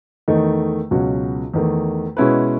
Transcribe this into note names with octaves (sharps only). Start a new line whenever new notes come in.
E2 D#3 A3 D#4
C#2 B2 F#3 C#4 F#4
E2 D#3 A3
B2 G#3 C#4 E4 B4